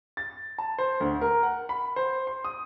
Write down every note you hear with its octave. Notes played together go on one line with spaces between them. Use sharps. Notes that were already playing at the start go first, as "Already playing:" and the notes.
A6
A5
C5
D2
A#4
F#5
B5
C5
C6
D#6